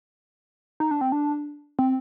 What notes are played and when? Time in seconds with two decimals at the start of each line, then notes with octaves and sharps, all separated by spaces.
0.80 D#4
0.91 D4
1.01 C4
1.12 D4
1.79 C4